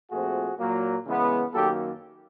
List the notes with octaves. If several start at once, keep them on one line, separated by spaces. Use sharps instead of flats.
A#2 F3 A3 C4 F#4 G#4
A#2 F#3 A#3
C#3 E3 G#3 B3
F#2 D#3 F#3 A#3 G4 A4